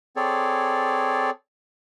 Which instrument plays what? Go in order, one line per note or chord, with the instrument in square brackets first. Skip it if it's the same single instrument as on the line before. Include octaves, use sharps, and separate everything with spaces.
[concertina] C4 G#4 A4 C#5 D5